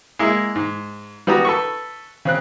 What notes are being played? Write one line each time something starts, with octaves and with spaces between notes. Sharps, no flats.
G#3 A#3 E4
G#2
G3 B3 F#4 A#5 D#6
A4 B4 C#6
C#3 C4 F#6